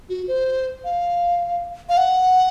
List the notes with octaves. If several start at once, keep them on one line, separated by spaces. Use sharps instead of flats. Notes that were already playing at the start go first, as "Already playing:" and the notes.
F#4
C5
F5
F5
F#5